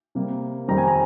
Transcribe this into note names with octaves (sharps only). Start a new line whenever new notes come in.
C3 G3 A#3
F2 D#3 G3 C4 A#5
G#5
A#5